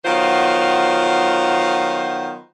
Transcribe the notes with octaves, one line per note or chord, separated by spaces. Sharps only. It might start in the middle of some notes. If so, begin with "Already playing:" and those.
D#3 F#3 B3 F4 C5